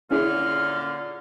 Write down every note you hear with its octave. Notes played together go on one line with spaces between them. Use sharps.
A#2 D3 C#4 E4 F4 G#4 F6